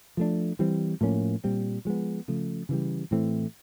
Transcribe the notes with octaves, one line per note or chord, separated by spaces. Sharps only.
F3 A3 D4
E3 G3 C4
A2 F3 A#3 C#4
A#2 G3 C4
F3 G#3 B3
C#3 F3 A3
C#3 E3 G3
A2 E3 A3 C4